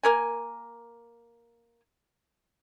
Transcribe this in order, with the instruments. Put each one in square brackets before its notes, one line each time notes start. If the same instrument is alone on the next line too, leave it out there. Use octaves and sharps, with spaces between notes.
[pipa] A#3 A#4 G#5